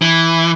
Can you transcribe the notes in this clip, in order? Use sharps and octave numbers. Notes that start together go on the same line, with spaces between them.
E3